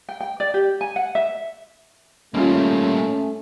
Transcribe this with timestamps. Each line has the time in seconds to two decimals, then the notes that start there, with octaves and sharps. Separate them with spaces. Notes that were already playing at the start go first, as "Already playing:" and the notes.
0.09 G5
0.20 G5
0.40 D5
0.54 G4
0.81 G#5
0.96 F#5
1.15 E5
2.34 G#1 G3 A3 A#3 C#4 F4